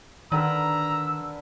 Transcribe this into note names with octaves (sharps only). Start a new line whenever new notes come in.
D3 D#3 A#4 B4 A#5 E6